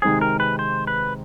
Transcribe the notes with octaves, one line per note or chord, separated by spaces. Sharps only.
C3 D#3 G#3 C4 G#4
A#4
B4
C5
B4